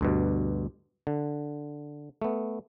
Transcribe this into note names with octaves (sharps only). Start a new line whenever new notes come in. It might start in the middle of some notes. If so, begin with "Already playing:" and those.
D2 G2 B2
D3
A3 B3